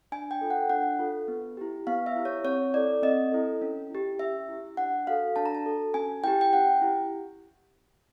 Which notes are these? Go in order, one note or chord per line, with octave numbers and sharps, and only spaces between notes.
D4 G#5
G5
F4 A4
F#5
D4 F#5
F4 A4
B3
E4 G4
B3 F5
E5
E4 G4
C#5
C4 C#5
E4 A4 D5
C4 D#5
E4 A4
C#4
E4 G4
C#4 E5
E4 G4
D4 F#5
F#4 A4 F5
D4 A5
A#5
A5
F#4 A4
C#4 G#5
E4 G4 G5
G5
C#4 F#5
E4 G4